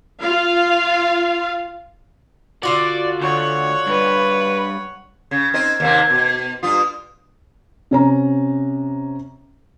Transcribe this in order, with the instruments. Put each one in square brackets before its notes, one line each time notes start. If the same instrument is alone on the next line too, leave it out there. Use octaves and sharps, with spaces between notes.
[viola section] F4 F5
[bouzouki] D3 F4 F#4 [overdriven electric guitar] D5
[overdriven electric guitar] D2 [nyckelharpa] C#5 F#5
[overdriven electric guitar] G2 [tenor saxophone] B4
[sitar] C#3 [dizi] G#6
[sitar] C4 D#4 D#5
D#2 C3 A#3
B2
[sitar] G2 F4 [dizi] D#6
[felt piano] C3 C#4 A#5